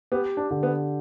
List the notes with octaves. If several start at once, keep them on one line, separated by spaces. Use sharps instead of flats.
B3 G4
D4
D3
B3